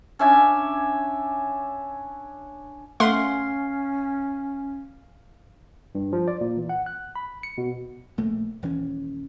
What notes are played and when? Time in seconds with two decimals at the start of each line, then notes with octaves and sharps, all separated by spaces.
0.19 C#4 D4 E5 G#5
3.00 A3 C#4 F5 F#5 C6
5.95 G2
6.13 F3
6.28 D5
6.41 A#2
6.57 E3
6.69 F#5
6.86 F#6
7.16 B5
7.43 C#7
7.58 B2
8.17 A#1 A3 A#3
8.62 D#1 E3 C#4